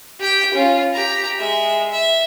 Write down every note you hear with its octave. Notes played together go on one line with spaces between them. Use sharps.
G4 G5
C#4 F4
G4 A#5
G#3 E5
E5